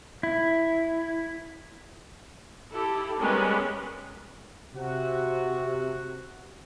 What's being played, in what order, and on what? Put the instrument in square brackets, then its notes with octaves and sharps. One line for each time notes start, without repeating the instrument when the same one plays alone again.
[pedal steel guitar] E4
[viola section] E4 G4 A4
G3 G#3 B3 C#4 A#4 B4
[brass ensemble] C3 F#4